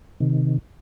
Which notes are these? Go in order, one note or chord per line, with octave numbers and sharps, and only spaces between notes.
C3 D#3